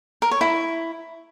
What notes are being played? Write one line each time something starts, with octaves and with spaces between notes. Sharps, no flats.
A#4
C#5
E4